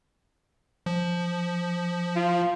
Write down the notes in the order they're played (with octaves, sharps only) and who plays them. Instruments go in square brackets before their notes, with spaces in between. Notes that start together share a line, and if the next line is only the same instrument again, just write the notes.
[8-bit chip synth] F3
[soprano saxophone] F4